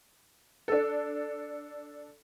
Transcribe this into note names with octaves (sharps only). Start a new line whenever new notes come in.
D4 A4